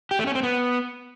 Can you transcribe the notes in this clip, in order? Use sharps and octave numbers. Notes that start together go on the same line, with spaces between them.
G4
A3
C#4
C4
B3